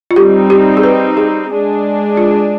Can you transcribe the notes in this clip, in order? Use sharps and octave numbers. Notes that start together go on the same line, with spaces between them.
F4
G3 C4 D#4 G4
G4
G#4
B4
G#4
G#3 D4 G#4
F4